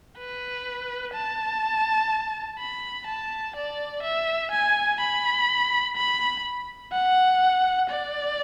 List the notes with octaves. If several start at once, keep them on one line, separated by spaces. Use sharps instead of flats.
B4
A5
B5
A5
D5
E5
G#5
B5
B5
F#5
D5